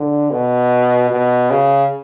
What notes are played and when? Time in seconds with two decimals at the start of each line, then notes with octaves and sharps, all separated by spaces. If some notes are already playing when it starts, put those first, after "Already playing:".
Already playing: D3
0.31 B2
1.10 B2
1.50 C#3